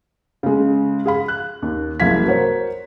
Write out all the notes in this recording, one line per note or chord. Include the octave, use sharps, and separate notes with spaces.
C#3 G#3
G#4 F5 B5
F#6
D#2
F#1 C2 E4 F5 G#6 B6
F#4 A#4 C5 C#5